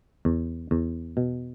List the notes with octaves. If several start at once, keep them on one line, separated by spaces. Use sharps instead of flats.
E2
E2
B2